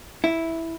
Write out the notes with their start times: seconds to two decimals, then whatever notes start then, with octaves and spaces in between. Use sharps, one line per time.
0.24 E4